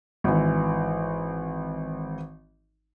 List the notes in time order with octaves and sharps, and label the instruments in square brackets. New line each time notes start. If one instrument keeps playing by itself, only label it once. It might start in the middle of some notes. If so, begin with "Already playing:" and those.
[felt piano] G#1 E3